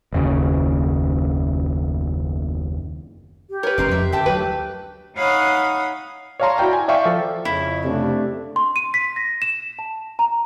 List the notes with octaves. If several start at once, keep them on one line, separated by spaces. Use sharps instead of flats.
F#1 D#2 C#3
G4
A#4 B4 C#5
F#1 A2 C#4 A#5 C6 D6
F2 E5
D3 G4 E5 G5 A5
D2 F#3 B4
D#4 C#5 F5 F#5 B5 D#6
C#5 D5 F5 A5 A#5 C6
E4 F#4 D5 G5 A#5
G#5
D5 E5 F5 G5 C#6
F3 A4
F2 C#3 E4
C3 A3 D4
C6
D#7
B6
A#6
E7
A5
A#5